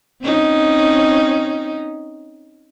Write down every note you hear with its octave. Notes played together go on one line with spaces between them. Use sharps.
C4 C#4 D#4